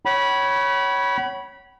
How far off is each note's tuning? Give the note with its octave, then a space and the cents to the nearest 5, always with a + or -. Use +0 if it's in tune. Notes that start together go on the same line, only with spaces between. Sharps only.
C#5 +0 F#5 +45 B5 -15